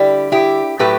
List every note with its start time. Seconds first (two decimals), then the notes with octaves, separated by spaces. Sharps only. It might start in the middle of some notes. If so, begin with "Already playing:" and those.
Already playing: D3 G3 E4 G4
0.32 E4 G4
0.79 A2 F#3 A3 G4 B4